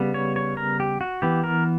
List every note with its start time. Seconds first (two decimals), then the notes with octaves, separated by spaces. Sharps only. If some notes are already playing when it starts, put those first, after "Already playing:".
Already playing: C#3 G3 B3
0.14 C#5
0.36 C#5
0.57 A#4
0.80 G4
1.01 F#4
1.22 E3 B3 G4
1.44 A#4